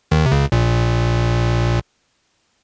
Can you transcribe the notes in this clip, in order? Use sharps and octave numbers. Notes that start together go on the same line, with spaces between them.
D#2 D#3
C3
C#2 C#3
A#1 A#2